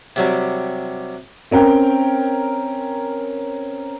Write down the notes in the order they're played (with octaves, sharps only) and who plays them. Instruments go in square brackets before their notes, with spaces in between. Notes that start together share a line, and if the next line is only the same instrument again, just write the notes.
[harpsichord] C3 F#3 G3
[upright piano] C4 C#4 A#4 G5